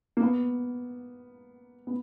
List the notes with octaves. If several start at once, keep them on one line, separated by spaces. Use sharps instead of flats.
A#3
B3
B3